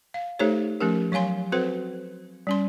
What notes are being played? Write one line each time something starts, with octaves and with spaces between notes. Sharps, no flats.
F5
A3 D#4 G4 A4 C5 C#5
F3 A3 C#4 G4 A#4
F#3 C#5 F5 G#5 C6
C4 F#4 A4 B4 C5
G3 C#4 C6